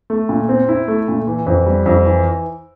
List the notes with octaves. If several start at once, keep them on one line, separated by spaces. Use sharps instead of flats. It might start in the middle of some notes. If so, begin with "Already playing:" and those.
A3
A#2
C4
E4
A3
A#2
E3
F2
G3
F2
E3